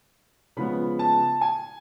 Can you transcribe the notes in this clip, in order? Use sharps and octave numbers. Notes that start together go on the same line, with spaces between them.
C#3 F3 G#3 B3 B5
A5
G#5